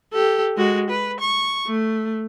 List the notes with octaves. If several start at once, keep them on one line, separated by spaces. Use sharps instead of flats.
G4 A4
G#3 F#4
B4
C#6
A3